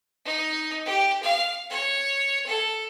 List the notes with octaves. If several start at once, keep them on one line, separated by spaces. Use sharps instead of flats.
D#4
G4
F5
C#5
A4